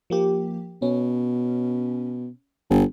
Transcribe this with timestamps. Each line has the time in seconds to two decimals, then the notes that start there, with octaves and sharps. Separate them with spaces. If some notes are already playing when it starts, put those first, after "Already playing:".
0.10 F3 A#3 G4
0.82 B2 C#4
2.70 G1